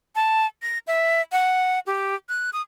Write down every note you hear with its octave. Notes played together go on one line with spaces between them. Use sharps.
A5
A#6
E5
F#5
G4
F#6
D#6